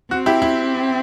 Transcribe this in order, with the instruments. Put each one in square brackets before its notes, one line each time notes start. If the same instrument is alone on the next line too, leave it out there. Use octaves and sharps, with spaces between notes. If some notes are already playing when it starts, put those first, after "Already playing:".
[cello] C4 [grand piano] F#4
[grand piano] E4 G4
E4